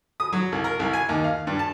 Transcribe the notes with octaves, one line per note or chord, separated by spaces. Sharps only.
D#6
F#3
C2
A#4
C2
G#5
D#2
F5
G2
A5